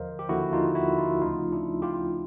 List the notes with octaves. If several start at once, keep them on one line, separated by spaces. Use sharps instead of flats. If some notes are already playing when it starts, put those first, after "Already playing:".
Already playing: D#2 D3 F3 A#4 C5 D#5 F5
G4
D#2 D3 F3 E4 F#4
D#4 F4
E4 F#4
D#4 F4
D2 C#3 F3 A3 C#4 D#4 F4
D4 E4
F4 G4